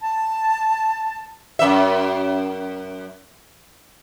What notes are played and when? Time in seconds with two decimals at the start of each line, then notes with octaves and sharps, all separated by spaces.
0.01 A5
1.59 F#2 E5